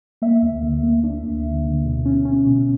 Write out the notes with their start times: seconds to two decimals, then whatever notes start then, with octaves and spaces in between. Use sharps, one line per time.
0.22 A#3 E5
0.42 D2
0.63 D3
0.83 A#3
1.04 D4
1.24 D2
1.45 D3
1.64 D3
1.86 B2
2.06 C#4
2.25 C#4
2.46 B2